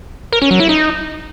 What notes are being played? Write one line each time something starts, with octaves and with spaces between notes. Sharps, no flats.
A#4
C#4
F#3
E4
D#4